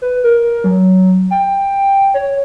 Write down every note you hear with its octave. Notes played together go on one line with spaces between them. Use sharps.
B4
A#4
F#3
G5
C#5